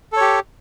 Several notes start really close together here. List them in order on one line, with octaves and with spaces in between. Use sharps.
A4 C#5 G4